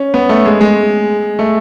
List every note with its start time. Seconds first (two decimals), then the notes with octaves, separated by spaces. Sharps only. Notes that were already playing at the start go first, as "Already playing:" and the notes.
Already playing: C#4
0.14 B3
0.29 A3
0.45 G#3
0.61 G#3
1.39 A3